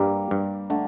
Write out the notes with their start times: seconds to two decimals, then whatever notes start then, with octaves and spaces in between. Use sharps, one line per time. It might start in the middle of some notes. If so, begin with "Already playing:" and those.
Already playing: G2 G3 A#3
0.31 G2
0.70 D3 A3